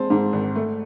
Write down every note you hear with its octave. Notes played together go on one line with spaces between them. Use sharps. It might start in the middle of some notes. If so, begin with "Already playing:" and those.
Already playing: G#3 C4 A5 C6
G#2
G#1
A3